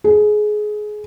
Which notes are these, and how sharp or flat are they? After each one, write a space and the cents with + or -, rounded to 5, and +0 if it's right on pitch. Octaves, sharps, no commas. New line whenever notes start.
G#4 +20